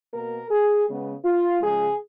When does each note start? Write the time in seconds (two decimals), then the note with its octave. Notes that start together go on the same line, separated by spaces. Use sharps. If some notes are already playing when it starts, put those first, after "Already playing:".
0.13 B2 A#3 A#4
0.50 G#4
0.88 C#3 G#3 B3
1.25 F4
1.62 C#3 F3 G#3 G#4